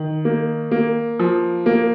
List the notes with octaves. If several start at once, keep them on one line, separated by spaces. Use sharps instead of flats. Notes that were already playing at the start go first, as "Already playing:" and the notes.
Already playing: D#3
A#3
A#3
F3
A#3